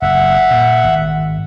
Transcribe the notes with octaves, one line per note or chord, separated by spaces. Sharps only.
F#1 E5 F#5
A#2
G#1